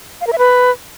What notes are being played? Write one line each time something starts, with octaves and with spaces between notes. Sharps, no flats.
F5
A#4
E5
B4